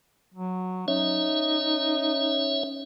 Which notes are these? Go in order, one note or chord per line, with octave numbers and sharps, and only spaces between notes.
F#3
C#4 D#4 C#5 E5